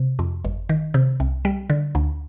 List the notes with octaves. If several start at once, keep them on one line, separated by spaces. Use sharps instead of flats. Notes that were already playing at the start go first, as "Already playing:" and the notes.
Already playing: C3
F2
G1
D#3
C3
C2
G3
D3
D2